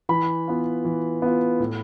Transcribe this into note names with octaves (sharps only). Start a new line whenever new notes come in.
E3 B5
B3 F4
E3
B3 F4
A2